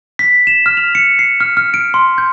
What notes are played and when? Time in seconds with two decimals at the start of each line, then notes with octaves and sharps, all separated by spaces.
0.19 B6
0.47 E7
0.66 F6
0.77 F7
0.95 C#7
1.19 C7
1.40 F6
1.57 F6
1.74 D7
1.94 C6
2.18 G6